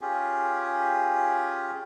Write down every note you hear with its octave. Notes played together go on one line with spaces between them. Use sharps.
C#4 F4 G4 G#4